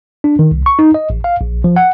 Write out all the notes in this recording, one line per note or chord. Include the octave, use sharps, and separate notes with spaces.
D4
D#3
C2
C#6
D#4
D#5
A1
F5
A#1
F3
F#5